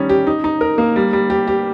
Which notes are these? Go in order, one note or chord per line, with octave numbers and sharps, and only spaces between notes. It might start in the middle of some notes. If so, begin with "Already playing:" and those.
Already playing: D#3 G3 C#4 D#4
G4
D#4
D#4
A#4
A#3
G3
G3
G4
G4